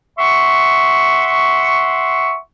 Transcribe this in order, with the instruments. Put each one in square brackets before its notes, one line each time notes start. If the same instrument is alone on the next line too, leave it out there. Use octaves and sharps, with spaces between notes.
[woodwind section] E5 F#5 C6 C#6